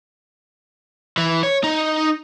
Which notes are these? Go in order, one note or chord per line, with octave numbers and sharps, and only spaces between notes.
E3
C#5
D#4